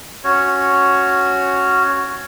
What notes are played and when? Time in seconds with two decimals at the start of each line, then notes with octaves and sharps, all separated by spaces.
0.24 C#4 F#4 C#5